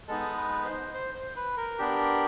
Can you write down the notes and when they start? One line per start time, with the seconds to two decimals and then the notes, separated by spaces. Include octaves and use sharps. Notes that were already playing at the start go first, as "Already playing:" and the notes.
0.08 G#3 B3 D#4 A4
0.37 B4
0.65 C5
0.94 C5
1.14 C5
1.36 B4
1.57 A#4
1.79 B3 D4 G4